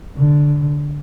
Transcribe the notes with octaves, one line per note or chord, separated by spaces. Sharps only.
D3